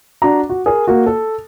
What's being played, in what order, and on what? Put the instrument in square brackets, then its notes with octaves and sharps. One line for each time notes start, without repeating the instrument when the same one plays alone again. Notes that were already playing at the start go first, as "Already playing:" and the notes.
[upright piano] D4 F#4 A#5
F#4
G#4 A#4
A#3 F#4
A4